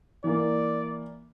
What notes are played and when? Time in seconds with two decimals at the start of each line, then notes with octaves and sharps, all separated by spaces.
0.24 E3 A#3 D5